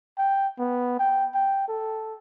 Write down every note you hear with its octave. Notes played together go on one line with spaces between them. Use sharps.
G5
B3
G5
G5
A4